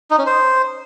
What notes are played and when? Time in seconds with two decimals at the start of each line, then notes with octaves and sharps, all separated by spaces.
0.11 D#4
0.18 C#4
0.26 C5